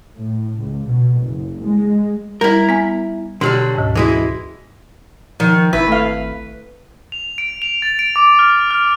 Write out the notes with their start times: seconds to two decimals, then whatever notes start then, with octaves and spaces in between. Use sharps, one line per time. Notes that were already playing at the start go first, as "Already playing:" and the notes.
0.16 A2
0.57 C#2
0.88 B2
1.24 F#1
1.64 G#3
2.41 G3 E4 A#4
2.69 B3 G#5
3.41 B2 D3 F#3 G3 G4
3.75 D2 G#2
3.95 E3 G#3 E4 F#4
5.40 D#3 F3
5.73 G#1 E4 B4
5.88 A3 F5
7.12 F7
7.38 D7
7.62 F7
7.82 A6
7.99 D7
8.16 D6
8.39 F6
8.71 F6